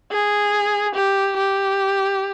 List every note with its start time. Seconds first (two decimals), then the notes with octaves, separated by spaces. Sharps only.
0.12 G#4
0.95 G4
1.37 G4